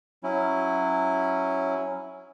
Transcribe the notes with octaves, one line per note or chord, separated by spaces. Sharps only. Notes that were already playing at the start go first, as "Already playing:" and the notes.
F#3 C#4 E4